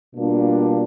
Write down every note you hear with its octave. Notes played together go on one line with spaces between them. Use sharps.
B2 G3 A#3 D4 F4